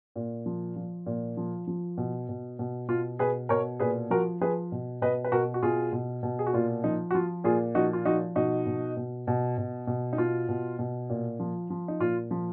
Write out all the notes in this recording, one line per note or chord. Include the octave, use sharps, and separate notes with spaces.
A#2
F3
F3
A#2
F3
F3
B2
B2
B2
B2 F4
B2 G#4 B4
B2 A#4 C#5
A#2 G#4 B4
F3 F#4 A#4
F3 G#4 B4
B2
B2 B4 D#5
B4
B2 F#4 A#4
F#4
B2 F4 G#4
B2
B2
G#4
F#4
A#2 F4
F3 D#4
F#4
F3 F4
A#2 F4 G#4
F3 D#4 F#4
F4
F3 D#4 F#4
B2 D#4 F#4
B2
B2
B2
B2
B2
D#4
B2 F4
B2
B2
A#2
F3
F3
D#4
A#2 F4
F3